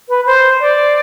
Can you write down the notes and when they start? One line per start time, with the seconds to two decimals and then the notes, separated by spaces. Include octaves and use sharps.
0.09 B4
0.26 C5
0.61 D5